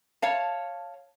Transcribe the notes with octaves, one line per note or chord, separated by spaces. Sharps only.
C#5 F5 A5